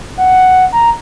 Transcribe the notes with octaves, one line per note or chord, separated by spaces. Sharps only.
F#5
A#5